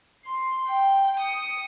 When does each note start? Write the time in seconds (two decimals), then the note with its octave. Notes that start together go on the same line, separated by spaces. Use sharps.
0.25 C6 C7
0.67 G5
1.20 D#6 C#7